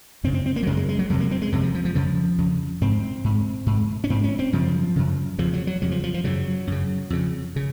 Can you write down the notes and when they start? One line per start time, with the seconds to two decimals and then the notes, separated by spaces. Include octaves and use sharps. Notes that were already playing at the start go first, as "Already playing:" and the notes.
0.24 F#2 C#3 C4
0.34 C4
0.46 C4
0.56 A#3
0.63 F#3
0.67 F#2 C#3 G#3
0.77 G#3
0.89 G#3
0.99 F#3
1.10 F2 C3 F#3
1.20 A#3
1.31 C4
1.42 G#3
1.52 F2 C3 F#3
1.63 F3
1.74 F3
1.85 F3
1.95 F2 C#3 F3
2.38 F2 C#3
2.81 G#2 C4
3.24 G#2
3.66 G#2
4.04 C#4
4.10 G#2 C4
4.24 C#4
4.39 C4
4.53 F#2 C#3 F3
4.96 F#2 C#3
5.38 F2 C#3 F3
5.53 F#3
5.67 F#3
5.82 F2 C#3 F#3
5.92 F3
6.04 F3
6.14 F3
6.24 F#2 C#3 F#3
6.67 F#2 C#3
7.10 F2 C#3
7.56 C#3